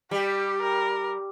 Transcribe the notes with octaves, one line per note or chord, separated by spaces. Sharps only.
G3 G4
A#4